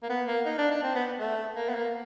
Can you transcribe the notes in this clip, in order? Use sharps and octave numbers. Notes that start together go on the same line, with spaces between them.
A#3
B3
A#3
D#4
D4
D4
C4
B3
A3
A#3
B3
A#3